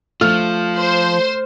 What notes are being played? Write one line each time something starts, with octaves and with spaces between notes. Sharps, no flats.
F3 A3 F4 F6
C5